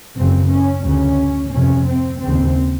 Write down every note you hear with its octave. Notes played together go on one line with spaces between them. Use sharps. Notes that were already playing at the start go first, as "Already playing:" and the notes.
F#2 C#3 C4
C#4
D2 C#3 C#4
F2 C3 C#4
C4
D#2 C#3 C4